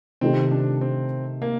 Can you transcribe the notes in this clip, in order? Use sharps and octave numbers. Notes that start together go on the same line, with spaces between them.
C3 D#3 A3 C4 D#4 G4
D4
C4
A#3